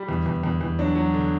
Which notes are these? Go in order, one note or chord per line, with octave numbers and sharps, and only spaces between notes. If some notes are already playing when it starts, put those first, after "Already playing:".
Already playing: G3
E2
E2
E2
E2
F#3 D4
F#3
D3